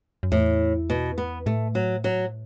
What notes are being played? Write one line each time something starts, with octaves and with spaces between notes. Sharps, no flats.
F#2
E2 A2
B2
B3
A2 A3
F#3
F#3